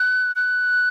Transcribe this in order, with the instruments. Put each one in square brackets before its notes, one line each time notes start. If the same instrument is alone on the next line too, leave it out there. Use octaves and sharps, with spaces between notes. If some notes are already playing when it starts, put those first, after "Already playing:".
Already playing: [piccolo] F#6
F#6